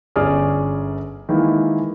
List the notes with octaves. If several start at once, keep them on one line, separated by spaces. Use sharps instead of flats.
G1 C#4 G#4 D5 F6
D#3 E3 G#3 A#3 E4